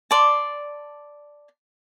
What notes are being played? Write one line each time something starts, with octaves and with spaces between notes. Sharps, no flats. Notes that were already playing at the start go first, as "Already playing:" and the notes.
D5 A5 C6